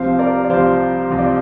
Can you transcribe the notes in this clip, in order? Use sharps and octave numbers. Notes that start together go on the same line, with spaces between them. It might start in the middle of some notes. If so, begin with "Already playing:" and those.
Already playing: C2 C3 F3 C5 F5
A#4 D5
D5
C2 C3 F3 C5 F5
C2 C3 F3 F5
D5